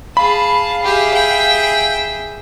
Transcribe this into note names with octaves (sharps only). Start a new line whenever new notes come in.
G#4 F5 A5 B5
G4 G#4 E5
G5